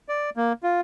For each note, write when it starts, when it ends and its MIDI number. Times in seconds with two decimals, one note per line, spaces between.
0.09 0.30 74
0.36 0.53 58
0.63 0.81 65